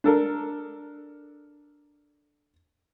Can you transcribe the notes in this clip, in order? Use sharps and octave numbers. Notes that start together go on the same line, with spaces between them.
D4 A4 A#4